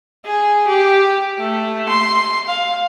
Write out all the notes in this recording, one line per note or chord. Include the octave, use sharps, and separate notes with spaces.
G#4
G4
A3
C6
F5